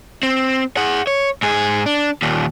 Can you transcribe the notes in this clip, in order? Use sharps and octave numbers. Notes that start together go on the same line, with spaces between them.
C4
G#4 F#5
C#5
G#2 G#4
D4
D#2 A#2